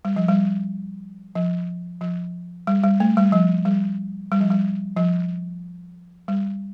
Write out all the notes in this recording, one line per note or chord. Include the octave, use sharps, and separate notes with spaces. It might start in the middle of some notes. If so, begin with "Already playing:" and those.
G3
F3
G3
F3
F3
G3
G3
A3
G3
F3
G3
G3
F3
G3
F3
G3